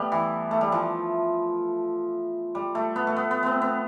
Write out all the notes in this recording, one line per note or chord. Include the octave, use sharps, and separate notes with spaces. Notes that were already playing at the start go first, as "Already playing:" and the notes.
Already playing: G3 A3 B3
E3
A3
G3
F3
G3
A3
B3
A3
B3
B3
B3 C4
B3